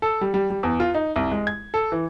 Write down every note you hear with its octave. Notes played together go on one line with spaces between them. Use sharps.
A4
G3
G3
G3
E2
F4
D#4
C2
G#3
G#6
A4
E3